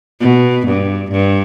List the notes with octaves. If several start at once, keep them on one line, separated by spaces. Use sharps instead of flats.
B2
G2
G2